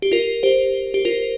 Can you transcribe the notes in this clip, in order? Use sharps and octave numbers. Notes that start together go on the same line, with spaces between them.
G4
F4 A#4
G4 C5
G4
F4 A#4